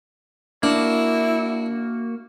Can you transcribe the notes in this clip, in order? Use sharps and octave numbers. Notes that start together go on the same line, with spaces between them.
A#3 D4 E4 F#4